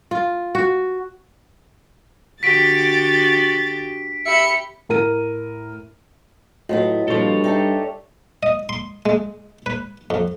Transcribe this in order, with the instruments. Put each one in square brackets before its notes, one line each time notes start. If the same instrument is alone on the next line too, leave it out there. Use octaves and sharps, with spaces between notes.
[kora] F4
F#4
[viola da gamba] D3 F#4 G4 [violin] A6 [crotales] B6 D7
[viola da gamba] G4 [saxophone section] E5 [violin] B5 C#7
[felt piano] A2 A#4 D#7
[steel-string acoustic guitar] A2 F#3 B3 [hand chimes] F4 F#4 D#5
[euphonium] G2 [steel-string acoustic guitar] A#2 F3 [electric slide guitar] A4 C#5
[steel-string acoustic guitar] D#4 G4 A5 [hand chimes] D5 E5
[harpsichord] D#5
C6
G#3
B4
F2